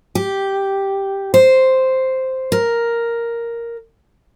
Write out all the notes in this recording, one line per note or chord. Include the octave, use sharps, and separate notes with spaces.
G4
C5
A#4